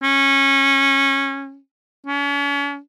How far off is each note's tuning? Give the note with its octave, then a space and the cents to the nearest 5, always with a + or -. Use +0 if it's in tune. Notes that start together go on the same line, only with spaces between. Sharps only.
C#4 -20
C#4 +40